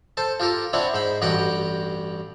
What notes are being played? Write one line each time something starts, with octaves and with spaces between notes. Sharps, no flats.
A4 C5 A5
F4 G4 A4 A#4
C4 D4 E4 C#5 F#5
G#2 C5 B5
A1 G2 F#4 G4 F#5 G5